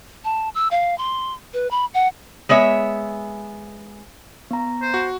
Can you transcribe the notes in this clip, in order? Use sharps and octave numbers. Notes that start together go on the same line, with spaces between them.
A5
E6
F5
C6
B4
B5
F#5
G#3 B3 C#5 E5
B3 A#5
C5
F#4